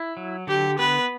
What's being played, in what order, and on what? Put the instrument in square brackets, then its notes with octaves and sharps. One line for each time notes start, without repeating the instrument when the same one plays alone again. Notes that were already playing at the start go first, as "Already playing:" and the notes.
Already playing: [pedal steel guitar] E4
F#3
[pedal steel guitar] D3 [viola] G4
[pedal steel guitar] B3 [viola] B4